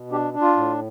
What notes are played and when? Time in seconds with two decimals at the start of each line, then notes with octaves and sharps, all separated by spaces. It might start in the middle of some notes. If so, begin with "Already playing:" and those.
Already playing: B2
0.12 D4 G4
0.34 D4
0.41 F4
0.56 A2